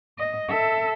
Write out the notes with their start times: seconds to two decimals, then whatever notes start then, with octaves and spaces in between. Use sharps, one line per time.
0.18 D#5
0.48 A4 E5